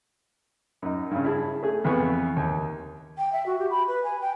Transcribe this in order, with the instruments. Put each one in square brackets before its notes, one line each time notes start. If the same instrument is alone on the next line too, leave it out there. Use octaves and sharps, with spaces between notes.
[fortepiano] F#2 D#4
G2 C#3
E4 G#4 A5
A3 G#4
F2 E3 B3 B4 C#6
D#2
[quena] G5
E5
F#4
G4
B5
B4
G#5
G5